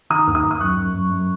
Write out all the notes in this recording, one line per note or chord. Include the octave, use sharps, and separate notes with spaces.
D#3 A#5 D#6
D#2
A#5 D#6
D#2
D#6
F#2 C#6 F#6
F#2
F#2
F#2